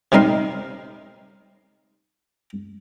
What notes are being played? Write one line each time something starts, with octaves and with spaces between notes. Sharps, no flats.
C3 G3 D#4 A#4 C6